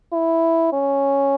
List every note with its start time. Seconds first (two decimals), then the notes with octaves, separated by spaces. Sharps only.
0.13 E4
0.73 C#4